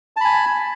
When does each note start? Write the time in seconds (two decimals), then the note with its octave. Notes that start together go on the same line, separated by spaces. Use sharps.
0.16 A5
0.21 B5
0.25 G#5